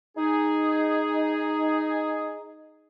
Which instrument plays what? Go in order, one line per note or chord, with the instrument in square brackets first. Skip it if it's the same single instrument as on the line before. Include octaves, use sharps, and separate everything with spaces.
[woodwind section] D#4 G#4